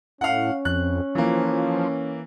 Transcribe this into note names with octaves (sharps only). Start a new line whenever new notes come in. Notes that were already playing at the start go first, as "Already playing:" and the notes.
A2 C#4 F5 F#5
F2 F#6
E3 F3 A#3